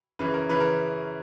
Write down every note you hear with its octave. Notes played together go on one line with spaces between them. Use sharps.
F#2 C#3 E3 B4
A#4
C#3 E3 B4
A#4